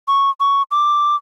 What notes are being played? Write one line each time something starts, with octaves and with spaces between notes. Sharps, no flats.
C#6
C#6
D6